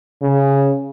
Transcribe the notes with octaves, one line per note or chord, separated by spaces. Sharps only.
C#3